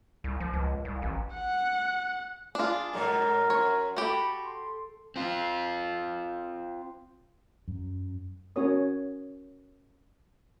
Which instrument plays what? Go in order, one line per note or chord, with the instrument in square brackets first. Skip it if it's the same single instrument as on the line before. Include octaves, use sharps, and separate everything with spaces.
[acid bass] C2
F3
C#2
C2
A1
[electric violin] F#5
[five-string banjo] D4 F4 [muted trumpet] G#4
[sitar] G#2 B2 F#3 [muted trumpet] A#4
[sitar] F#2 [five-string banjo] C#5
[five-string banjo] F#4 G4 [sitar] A4 [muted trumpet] B5
[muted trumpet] C6
[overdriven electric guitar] C4 F4
[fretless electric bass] F#2
[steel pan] C#4 F#4 A#4 C#5 D#6